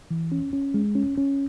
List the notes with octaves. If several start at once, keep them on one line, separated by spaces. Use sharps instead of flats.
E3
C#4
C#4
G#3
C#4
C#4